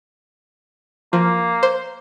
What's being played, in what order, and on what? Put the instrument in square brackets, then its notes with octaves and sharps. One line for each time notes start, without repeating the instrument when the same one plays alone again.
[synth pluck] F3 [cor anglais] A#3
[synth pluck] C5